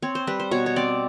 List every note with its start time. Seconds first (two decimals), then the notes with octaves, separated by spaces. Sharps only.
0.02 C4 C#5
0.15 C5
0.27 G3 B4
0.40 C5
0.51 B2 C#5
0.66 C#5
0.76 C4 D5